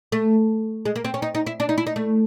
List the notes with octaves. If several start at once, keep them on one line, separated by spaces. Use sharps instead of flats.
A3
G#3
A#3
C4
C#4
D#4
D#4
E4
D4
D#4
E4
D#4
A3